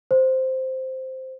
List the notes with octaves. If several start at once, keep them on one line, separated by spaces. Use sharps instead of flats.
C5